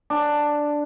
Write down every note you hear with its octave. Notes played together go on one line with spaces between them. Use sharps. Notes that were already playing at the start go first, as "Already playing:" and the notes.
D4